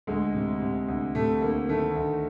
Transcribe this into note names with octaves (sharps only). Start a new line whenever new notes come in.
D2 G#3
C3
C3
D2
C3 A3
D2 A#3
D#3 A3
D2